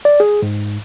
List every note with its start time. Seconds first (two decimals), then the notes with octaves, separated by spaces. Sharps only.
0.05 D5
0.20 G#4
0.42 G#2